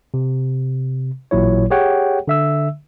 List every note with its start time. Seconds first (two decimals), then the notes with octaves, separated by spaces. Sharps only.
0.14 C3
1.31 A1 A#2 F#3 E4 C#5
1.71 G4 G#4 C#5 F#5 G5
2.28 D3 E5 E6